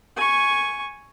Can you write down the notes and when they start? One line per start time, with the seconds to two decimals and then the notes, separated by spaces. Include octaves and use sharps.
0.16 G#5 C#6